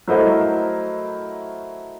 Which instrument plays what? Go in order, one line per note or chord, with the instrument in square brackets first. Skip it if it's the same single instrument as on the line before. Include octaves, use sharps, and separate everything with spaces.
[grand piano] F#3 A3 E4 A#4 C5 D#5